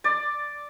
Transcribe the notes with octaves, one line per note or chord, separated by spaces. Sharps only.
D5